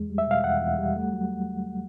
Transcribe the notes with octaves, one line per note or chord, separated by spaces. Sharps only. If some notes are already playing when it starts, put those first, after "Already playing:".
Already playing: E2 G#3
G3
E5
B2 F5
E2 F#5
E2
G3
A3
F#3